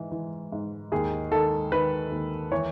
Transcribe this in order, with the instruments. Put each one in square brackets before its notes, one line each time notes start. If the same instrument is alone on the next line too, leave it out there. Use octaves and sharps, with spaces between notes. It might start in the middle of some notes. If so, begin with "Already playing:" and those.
Already playing: [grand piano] G#2 E3
E3
G#2
D#2 G#4
D#3 A4
D#3 B4
D#2
E3 C#5